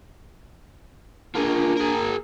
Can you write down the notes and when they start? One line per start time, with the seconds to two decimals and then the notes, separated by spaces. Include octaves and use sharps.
1.35 A#3 D4 F4 G#4
1.77 G#4 A#4